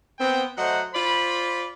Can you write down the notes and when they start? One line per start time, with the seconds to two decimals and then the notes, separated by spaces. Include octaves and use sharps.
0.18 B3 C4 G5
0.57 F#3 A3 C5 D#5 F#5
0.94 F4 C5 D5 B5